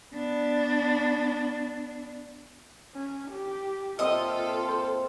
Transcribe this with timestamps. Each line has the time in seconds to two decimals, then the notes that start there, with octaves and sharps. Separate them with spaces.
0.13 B3 D4
2.94 C#4
3.31 G4
3.99 A#2 C4 F4 A4 D#5 E5 D#6
4.68 C5